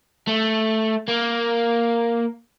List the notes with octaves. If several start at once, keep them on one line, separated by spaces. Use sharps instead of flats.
A3
A#3